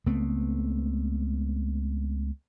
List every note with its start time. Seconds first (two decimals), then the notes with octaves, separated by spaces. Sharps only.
0.06 C#2 A3 B3 C4